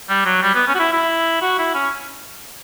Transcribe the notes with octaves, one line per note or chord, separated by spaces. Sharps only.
G3
F#3
G3
B3
C#4
F#4
E4
E4
F#4
E4
C#4